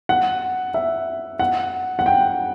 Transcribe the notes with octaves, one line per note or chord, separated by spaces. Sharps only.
F#5
E5
F#5
F#5
G5